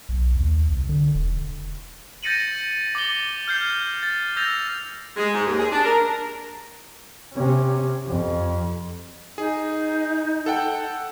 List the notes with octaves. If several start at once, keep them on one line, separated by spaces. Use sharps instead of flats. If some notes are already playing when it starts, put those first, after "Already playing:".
B1
D#2
C2
D3
E1
G6 A6 A#6 C#7 D#7 F#7
D6 A6 G7
F6 G6 C7
A6
E6 G6 A6 A#6 F7
G#3
G#2
D#2
G#4
D4
A#4
C3 C#4
F2
D#4 G#4
A4 F#5 G5